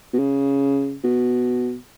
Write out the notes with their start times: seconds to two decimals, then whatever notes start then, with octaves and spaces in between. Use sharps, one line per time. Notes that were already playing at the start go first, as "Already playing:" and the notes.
0.13 B2
0.19 C#3
1.04 B2